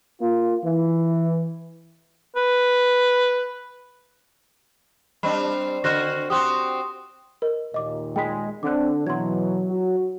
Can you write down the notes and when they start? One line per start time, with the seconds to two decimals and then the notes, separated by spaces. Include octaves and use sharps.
0.20 A#3 F4
0.64 E3
2.36 B4
5.23 G3 C4 D4 B5
5.84 D3 F#4 C5 F6 F#6 A#6
6.30 C4 F#4 G4 C6 D#6
7.42 A#4 D#5
7.74 D#2 A#2 D#5 D6
8.16 G#3 G5 B5 B6
8.63 D3 C4 D6 F#6
9.07 B2 E3 F#3 C6 G#6
9.71 F#4